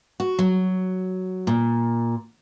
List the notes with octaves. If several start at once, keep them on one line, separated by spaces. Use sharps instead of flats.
F#4
F#3
A#2